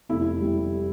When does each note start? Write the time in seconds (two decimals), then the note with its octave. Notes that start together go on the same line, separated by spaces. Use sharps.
0.09 F1 E4
0.41 G3